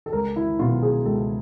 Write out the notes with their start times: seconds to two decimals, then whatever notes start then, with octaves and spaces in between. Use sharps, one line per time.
0.06 A4
0.12 C#2 A#4
0.36 E4
0.59 B2 F#3 F4
0.82 G#4
1.05 C#2 A4